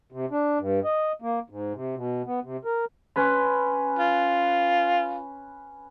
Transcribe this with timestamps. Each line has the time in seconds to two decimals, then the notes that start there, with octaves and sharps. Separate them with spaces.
0.12 C3
0.31 D4
0.59 G2
0.84 D#5
1.22 A#3
1.50 G#2
1.74 C3
1.96 B2
2.26 B3
2.43 C3
2.65 A#4
3.16 C#4 B4 C6
3.99 F4